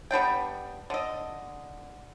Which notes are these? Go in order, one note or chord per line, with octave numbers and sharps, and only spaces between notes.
G3 B3 D4 G5
D3 D#5